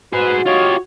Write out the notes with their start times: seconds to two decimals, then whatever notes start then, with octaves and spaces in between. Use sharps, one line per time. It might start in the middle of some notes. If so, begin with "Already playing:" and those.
0.13 F#4 G#4 B4 C5
0.46 F4 G4 C#5 D#5